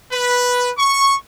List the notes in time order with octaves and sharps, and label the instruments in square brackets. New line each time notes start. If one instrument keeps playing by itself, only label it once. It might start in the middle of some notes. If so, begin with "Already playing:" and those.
[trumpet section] B4
C#6